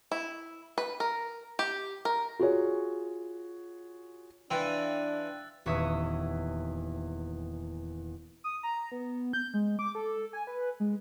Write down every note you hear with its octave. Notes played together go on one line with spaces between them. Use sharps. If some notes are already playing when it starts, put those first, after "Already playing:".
E4
B4
A#4
G4
A#4
F4 F#4 G#4 C#5
E3 D4 F5 G5 C6 E6 F#6 A6
D#1 E2 C#5 E5 D#6
D#6
A#5
B3
G6
G#3
D6
A4
G#5
B4
G#3